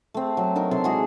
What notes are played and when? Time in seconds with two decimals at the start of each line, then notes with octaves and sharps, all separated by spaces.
0.14 A3 C4
0.37 F#3
0.56 D4 D#4 A#4
0.71 C3 A4 C6
0.84 G#3 E4 F#4 G#4